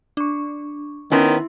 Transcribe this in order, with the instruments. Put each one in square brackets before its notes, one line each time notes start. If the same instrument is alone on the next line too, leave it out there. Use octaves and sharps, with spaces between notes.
[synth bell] D4 C#6
[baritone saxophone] D#3 [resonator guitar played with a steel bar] B3 C#4 [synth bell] E4 C6